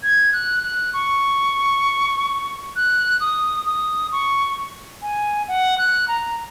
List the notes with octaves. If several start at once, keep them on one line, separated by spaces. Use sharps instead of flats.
G#6
F#6
F#6
C#6
F#6
D#6
D#6
C#6
G#5
F#5
F#6
A#5